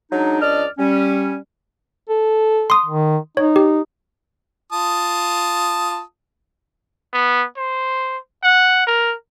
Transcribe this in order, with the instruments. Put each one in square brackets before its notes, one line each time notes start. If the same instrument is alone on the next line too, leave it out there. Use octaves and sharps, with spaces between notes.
[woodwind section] F#3 G#3 D4 D#4
C#2 D4 D5 D#5 F6
G3 C#4
[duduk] A4
[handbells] C6 D#6
[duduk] D#3
[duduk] D#4 [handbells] C#5
[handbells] G4
[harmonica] F4 A5 D#6
[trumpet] B3
C5
F#5
A#4